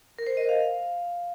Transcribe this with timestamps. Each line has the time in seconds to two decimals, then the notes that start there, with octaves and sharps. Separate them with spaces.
0.19 A#4
0.27 C5
0.37 D#5
0.49 F5